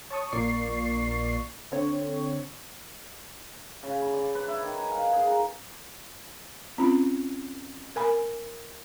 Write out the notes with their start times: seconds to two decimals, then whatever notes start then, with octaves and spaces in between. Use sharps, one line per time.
0.10 C#5 A5 C#6 D#6
0.32 A#1 A#2 A#3 D5 C#6 C7
1.72 D3 C4 C#5
3.83 C#3
4.02 B5
4.14 D5
4.35 B4
4.48 E4
4.62 D#3
4.78 G#5
4.91 F5
5.13 G#4
5.27 A#5
6.78 C4 C#4 F4 B5
7.96 A#4 G#5 B5